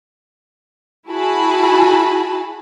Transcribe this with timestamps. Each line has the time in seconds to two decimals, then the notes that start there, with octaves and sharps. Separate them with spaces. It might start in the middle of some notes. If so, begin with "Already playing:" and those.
1.09 E4 F#4 G#4 G#5 A5 B5